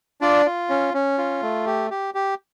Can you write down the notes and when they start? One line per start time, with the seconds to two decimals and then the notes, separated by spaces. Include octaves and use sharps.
0.21 D4 F4 D5
0.46 F4
0.69 C#4
0.94 C#4
1.18 F4
1.42 A3
1.66 G4
1.91 G4
2.14 G4